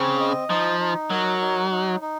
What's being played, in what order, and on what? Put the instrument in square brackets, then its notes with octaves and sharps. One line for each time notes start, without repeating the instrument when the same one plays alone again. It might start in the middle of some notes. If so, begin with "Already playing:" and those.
Already playing: [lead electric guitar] C#3 [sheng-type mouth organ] C4
[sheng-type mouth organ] D#5
[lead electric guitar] F3 [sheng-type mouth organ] D#4
[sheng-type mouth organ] D#4
[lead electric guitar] F#3 [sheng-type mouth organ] A#4
[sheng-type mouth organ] D#4
D#4
D#4